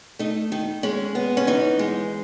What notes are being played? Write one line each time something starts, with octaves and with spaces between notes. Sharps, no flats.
A3 D#4
D#3 D#4
G#3 C#4
B3
C#4
E3 D#4
G#3